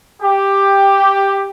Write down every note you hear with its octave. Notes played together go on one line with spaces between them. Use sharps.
G4